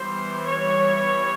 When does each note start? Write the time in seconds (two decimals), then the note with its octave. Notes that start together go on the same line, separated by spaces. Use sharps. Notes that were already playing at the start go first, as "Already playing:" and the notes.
Already playing: E3 G3 B3 C5
0.46 C#5